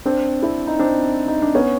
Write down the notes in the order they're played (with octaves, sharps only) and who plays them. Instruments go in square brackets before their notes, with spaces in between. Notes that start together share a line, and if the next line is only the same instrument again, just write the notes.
[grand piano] C4 D4
D4 E4
D#4
C4 D4
D#4
D4
B3 C#4